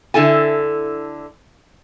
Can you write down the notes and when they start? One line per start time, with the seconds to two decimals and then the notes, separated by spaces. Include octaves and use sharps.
0.14 D3 E4 A4 G#5